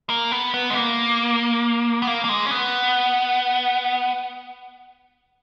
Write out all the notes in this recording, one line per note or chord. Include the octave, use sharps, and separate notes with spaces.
A#3
B3
B3
G#3
A#3
B3
A#3
A#3
G#3
C#4
B3